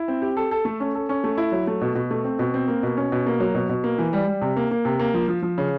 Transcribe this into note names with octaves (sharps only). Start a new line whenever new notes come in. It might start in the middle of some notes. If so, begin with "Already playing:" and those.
Already playing: E4
C4
G4
A4
A4
A3
C#4
A4
C#4
A3
E4
F#3
A3
B2
B2
A3
C4
B2
C4
A#3
B2
C#4
B2
A#3
F#3
B2
B2
A#3
E3
G3
G3
C3
A#3
A#3
C3
A#3
F3
F3
F3
C#3